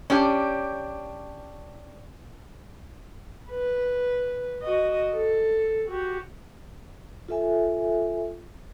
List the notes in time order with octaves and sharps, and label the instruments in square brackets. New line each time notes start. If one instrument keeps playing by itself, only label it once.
[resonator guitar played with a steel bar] C#4 D4 G4
[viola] B4
F#4 D#5
A4
F#4 G4
[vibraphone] F4 A4 E5 G#5